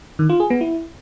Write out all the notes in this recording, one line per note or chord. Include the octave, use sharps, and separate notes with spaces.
D#3
F4
G#4
B3
E4